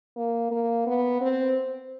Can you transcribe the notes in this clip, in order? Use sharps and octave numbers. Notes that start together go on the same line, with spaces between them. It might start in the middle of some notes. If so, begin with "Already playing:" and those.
A#3
A#3
B3
C4